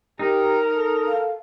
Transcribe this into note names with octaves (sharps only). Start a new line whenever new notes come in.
D#4 G4 A#4
A4
F5